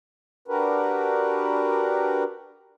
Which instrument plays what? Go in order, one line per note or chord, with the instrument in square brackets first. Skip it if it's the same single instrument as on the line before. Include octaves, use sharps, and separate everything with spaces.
[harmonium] D4 F#4 G4 A#4 B4